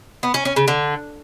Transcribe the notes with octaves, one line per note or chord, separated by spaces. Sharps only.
B3
C#4
C#4
C#3
D3